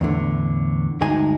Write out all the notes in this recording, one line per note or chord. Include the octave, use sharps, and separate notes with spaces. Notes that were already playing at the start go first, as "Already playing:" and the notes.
E2 A2 D3
D2 G2 G#3 D#4 G#5